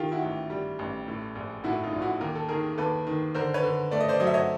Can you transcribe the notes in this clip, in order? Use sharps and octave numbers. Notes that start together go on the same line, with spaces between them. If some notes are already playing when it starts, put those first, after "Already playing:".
Already playing: D#3 F4 G4
E4 F#4
A1
G3
A1
A2
A#1
A2 E4 F#4
D#4 F4
A#1
F4
E4 F#4
D#2 A#4
A4
D#3 G#4 A#4
D#2 A4 B4
D#3
D3 A#4 C5
B4 C#5
D3
A3 D5
D#5
C5 D5
F#3 D#5
E5
C#5 D#5